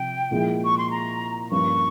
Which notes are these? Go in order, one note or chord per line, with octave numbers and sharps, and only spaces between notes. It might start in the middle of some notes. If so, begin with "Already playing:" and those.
Already playing: C3 F3 G5
A#2 F3 G#3 E4 G#4
C#6
C6
A#5
G2 F3 A#3 C#4 F4 C#6